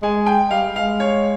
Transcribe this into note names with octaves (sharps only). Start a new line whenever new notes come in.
G#3 G#5
G5
G3 F5
G#3 F5
C#5